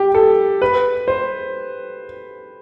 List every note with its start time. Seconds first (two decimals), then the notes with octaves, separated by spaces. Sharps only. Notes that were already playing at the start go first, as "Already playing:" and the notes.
Already playing: G4
0.15 A4
0.62 B4
1.08 C5